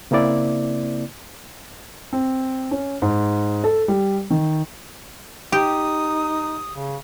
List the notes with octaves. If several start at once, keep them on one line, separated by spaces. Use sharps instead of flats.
C#3 A#3 C4 E4 D5
C4
C#4
G#2
A4
G3
D#3
D#4 G4 D#6
C#3